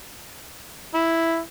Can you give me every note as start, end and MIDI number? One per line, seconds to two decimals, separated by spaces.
0.95 1.39 64